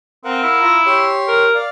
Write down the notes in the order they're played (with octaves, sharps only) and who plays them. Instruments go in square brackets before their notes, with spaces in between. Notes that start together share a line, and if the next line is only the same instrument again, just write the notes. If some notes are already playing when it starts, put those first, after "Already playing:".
[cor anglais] C4 [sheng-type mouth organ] A#4 F5 F#5
[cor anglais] E4
[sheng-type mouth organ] F4 E5 A#5
G4 C#5 C6
[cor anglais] A#4
[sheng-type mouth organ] D5 F5